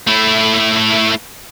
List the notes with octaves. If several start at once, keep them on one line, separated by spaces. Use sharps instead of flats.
A3 E4